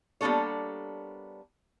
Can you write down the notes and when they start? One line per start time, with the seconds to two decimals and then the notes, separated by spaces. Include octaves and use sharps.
0.21 G3 A#3 B3 D4 A4 C#5